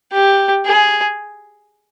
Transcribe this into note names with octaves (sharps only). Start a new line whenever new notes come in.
G4
G#4